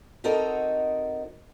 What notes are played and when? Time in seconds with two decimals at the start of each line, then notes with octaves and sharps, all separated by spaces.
0.24 C4 D#4 F#4 A4 A#4 D#5